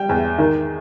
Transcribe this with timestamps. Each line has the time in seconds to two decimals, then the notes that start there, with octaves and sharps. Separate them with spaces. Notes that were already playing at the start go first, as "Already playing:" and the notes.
Already playing: G3 G5
0.09 E2
0.38 D#3